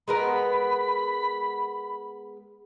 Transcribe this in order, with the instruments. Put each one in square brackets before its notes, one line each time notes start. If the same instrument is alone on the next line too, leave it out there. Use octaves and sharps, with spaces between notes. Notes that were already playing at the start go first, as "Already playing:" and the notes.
[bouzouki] G#3 B3 A#4 [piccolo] B5